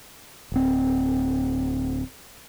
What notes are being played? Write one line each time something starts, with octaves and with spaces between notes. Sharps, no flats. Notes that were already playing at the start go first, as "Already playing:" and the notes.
D1 C4